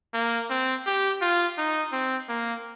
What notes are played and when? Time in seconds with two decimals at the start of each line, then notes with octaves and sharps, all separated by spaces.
0.14 A#3
0.50 C4
0.86 G4
1.21 F4
1.58 D#4
1.92 C4
2.29 A#3